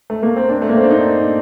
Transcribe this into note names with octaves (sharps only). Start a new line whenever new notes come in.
A3
A#3
C4
D4
A3
A#3
C4
D4
D#4